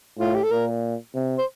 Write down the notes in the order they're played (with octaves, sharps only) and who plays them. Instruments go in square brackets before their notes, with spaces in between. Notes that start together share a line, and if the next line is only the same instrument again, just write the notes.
[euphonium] A2 [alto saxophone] F4
[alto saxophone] G4
A4
[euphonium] A#2 [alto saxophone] A#4
[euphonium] C3
[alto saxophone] C5